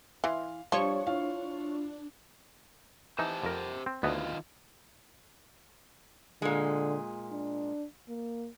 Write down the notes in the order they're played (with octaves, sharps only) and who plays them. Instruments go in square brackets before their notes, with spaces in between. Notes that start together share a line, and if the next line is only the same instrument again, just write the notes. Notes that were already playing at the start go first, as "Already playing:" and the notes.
[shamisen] E3 [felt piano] F5 C6
[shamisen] F3 [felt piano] G3 [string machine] D4 [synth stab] C#5 C#6
[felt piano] E4 F4 F5
[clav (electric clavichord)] E3 D#4 [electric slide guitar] G4 C5 A5
[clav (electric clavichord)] F2 A#4
C4
[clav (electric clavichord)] D2 B3 D#5 [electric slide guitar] D#3 F4
[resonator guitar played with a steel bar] A#2 G#3 [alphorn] D3
[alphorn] D4
A#3